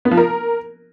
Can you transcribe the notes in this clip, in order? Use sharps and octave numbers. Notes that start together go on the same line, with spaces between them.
B3
F3
A#4